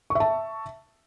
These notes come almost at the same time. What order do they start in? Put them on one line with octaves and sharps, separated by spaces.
C#6 E5 A5